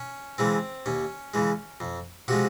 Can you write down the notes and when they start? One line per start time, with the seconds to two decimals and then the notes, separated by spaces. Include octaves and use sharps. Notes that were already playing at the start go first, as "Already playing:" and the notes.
Already playing: C#4
0.38 C#3 E3 G#3 C4
0.86 D#2 C#4
1.34 C#3 E3 G#3
1.80 F2
2.28 C3 F3 G#3 F#4